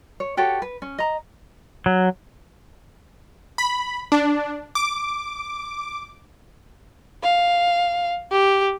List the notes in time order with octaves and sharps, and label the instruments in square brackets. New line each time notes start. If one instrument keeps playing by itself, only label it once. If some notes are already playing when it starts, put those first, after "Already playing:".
[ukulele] C#5
F#4 G4 A4 C#5
B4
C#4
D#5 A#5
[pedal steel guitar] F#3
[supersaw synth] B5
D4
D6
[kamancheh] F5
G4